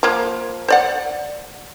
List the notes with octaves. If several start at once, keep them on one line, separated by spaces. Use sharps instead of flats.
F3 A#3
C5 D5 F#5